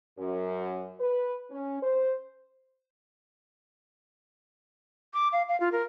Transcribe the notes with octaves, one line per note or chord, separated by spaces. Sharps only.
F#2
B4
C#4
C5
D6
F5
F5
F4
A#4